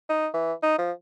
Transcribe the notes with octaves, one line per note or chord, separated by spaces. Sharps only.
D#4
E3
D#4
F3